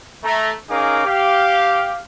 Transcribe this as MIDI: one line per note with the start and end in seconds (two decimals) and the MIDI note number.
0.24 0.52 57
0.24 0.52 82
0.70 1.02 61
0.70 1.02 63
0.70 1.02 68
0.70 1.02 70
0.70 1.02 77
0.70 1.02 86
1.06 1.99 67
1.06 1.99 77